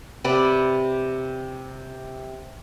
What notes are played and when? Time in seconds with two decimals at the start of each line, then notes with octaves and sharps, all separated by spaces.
0.24 C3 B4 D5 B5